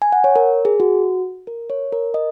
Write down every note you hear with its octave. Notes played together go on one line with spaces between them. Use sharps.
G#5
F#5
C#5
A#4
G#4
F#4
A#4
C#5
A#4
D#5